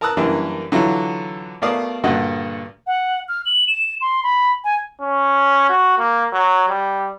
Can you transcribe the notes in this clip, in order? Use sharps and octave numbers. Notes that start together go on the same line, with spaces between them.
A#4 A5 A#5 D#6 E6 F#6
F#2 E3 G3 A#3 D4
D3 E3 F#3 E4 F4
B2 A3 A#4 D5 F5 D#6
G2 A#2 D3 F#4 D#5 F#5
F#5
F6
F#7
E7
C6
B5
G#5
C#4
F#4
A#3
F#3
G3